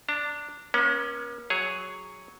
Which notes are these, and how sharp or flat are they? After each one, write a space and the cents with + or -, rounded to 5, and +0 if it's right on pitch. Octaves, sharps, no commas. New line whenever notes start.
D4 -5 A5 +45
A#3 +45 C#4 +0
F#3 +0 G#4 +0 C#5 +0